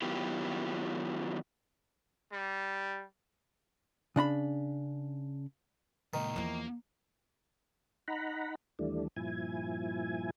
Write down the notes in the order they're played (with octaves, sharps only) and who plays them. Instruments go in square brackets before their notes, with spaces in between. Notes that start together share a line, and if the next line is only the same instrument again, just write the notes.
[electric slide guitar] D#3 F#3 B3 E4 F4 G4
[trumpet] G3
[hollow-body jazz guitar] C#3 D4 A#5 B5
[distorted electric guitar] C#2 A#2 [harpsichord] D#3
[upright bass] E2 F3 [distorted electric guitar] A#3
[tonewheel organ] D#4 F#5 A#5 B5
D#2 E3 G3 A3 D4
G2 A#2 F3 E4 G#5